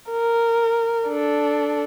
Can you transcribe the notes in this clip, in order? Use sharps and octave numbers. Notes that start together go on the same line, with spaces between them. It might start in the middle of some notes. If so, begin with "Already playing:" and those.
A#4
D4 A4